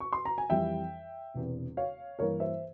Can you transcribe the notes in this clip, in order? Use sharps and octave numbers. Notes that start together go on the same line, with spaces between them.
C#6
C6
A#5
G#5
F2 E3 G3 E5 G5
E1 E2 C3
C#5 F5
G2 E3 A#3 A#4 C#5
C5 E5